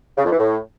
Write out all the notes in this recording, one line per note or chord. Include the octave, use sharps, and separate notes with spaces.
C#3
F2
E3
A2